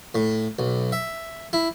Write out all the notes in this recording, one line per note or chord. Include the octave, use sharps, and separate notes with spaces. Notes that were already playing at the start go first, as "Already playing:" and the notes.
A2
B1
E5
E4